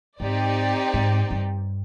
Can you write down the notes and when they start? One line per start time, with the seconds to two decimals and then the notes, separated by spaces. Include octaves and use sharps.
0.20 G#2 C4 D#4 G4 D5
0.94 G#2
1.31 G2